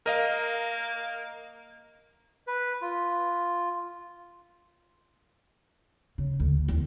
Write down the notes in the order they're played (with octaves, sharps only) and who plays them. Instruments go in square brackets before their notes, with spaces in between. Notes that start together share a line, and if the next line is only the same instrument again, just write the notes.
[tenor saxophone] A#3 [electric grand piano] A#4 D#5 F5
[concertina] B4
F4
[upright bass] C#3
D2
E2